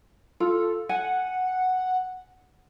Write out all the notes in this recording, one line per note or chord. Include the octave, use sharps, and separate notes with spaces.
F4 A4
F#5 G#5